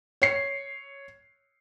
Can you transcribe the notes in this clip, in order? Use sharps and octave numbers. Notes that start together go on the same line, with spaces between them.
C#5 C7